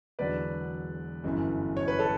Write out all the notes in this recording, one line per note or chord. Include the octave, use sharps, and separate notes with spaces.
E1 E2 D3 F#3 B4 D5
G1 F#2 E3
C#5
B4
A4 C#5